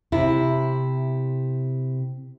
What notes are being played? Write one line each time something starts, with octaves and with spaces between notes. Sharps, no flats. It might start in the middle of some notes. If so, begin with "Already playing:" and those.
C3 E4